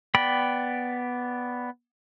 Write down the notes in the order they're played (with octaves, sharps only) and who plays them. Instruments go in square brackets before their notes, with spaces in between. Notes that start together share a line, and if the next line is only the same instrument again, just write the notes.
[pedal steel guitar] B3 D5 G5 B5